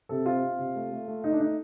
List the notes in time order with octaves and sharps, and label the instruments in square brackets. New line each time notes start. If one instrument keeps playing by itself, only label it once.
[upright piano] C3 A4
C4 F4
C4
C3
A3
A3
A3
A3 D#4
D4
A3 D#4